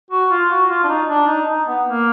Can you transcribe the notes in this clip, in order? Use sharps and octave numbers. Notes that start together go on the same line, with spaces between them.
F#4
F4
F#4
F4
D4
D#4
D4
D#4
D#4
B3
A#3